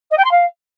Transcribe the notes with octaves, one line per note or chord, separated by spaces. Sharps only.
D#5
G5
C6
F5